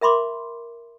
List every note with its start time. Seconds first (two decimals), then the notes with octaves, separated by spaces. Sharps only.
0.01 A#4 E5 B5 C6 D6